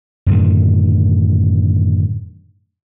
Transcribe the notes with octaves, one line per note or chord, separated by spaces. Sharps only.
F#2 A2 D3 D#3